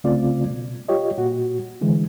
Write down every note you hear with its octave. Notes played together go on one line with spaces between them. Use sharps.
C2 C#3 A3 C4 F4 D5
B2
F4 G4 C#5 D#5
A#2 F#4
D3 E3 G#3